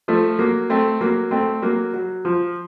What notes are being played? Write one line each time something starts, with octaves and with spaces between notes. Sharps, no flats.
F3 A3
F#3 A#3
A3 C4
F#3 A#3
A3 C4
F#3 A#3
F#3
F3